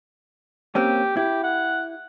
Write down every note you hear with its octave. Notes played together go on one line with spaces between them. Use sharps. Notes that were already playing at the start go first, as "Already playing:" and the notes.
A#3 C4 C#4 G4
E4 G4
F#5